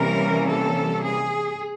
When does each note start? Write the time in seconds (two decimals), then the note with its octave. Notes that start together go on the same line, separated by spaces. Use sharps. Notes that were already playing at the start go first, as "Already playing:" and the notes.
Already playing: C3 E3 G3 A#3 C#4 A#4
0.47 A4
1.02 G#4